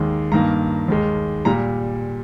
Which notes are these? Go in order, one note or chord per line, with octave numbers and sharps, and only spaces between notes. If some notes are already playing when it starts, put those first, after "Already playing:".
Already playing: D#2 D#3 G#3
G2 D#3 A#3 A#5
D#2 D#3 G#3
A#2 G3 A#5